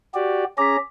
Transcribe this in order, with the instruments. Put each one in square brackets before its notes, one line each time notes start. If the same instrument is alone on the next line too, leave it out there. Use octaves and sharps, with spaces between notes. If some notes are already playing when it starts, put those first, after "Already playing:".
[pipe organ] F#4 G4 D5
[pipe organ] C#4 G#4 A#5 [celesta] D6 B6